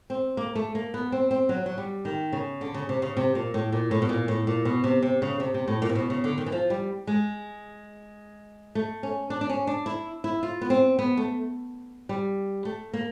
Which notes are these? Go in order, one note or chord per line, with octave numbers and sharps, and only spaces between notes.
C4
A#3
A3
A#3
B3
C4
C4
F#3
F#3
G3
D#3
C#3
D3
C#3
C3
C#3
C3
A#2
A2
A#2
A2
B2
A#2
A2
A#2
B2
C3
C3
C#3
C3
C3
A2
A#2
C3
B2
C#3
D3
D#3
E3
F3
G3
G#3
A3
C#4
D4
D4
C#4
D4
E4
E4
F4
B3
C4
B3
A3
G3
A3
A#3